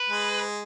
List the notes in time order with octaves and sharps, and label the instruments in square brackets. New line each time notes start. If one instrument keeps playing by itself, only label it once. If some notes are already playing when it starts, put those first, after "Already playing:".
Already playing: [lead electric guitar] B4
[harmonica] G#3